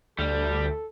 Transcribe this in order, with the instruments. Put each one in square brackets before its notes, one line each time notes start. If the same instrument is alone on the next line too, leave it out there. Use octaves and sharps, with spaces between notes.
[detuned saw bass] D2 [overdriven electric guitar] G3 [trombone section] A4